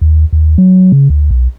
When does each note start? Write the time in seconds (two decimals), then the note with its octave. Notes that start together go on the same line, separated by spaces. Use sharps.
0.01 D#2
0.33 D#2
0.58 F#3
0.92 C#3
1.10 D2
1.31 B1